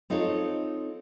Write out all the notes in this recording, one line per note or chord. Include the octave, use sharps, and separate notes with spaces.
C4 D#4 F4 A4 C#5